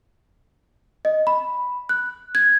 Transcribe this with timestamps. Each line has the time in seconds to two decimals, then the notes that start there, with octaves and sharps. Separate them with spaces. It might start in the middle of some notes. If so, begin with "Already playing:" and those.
1.05 D#5
1.27 B5
1.89 F#6
2.35 G#6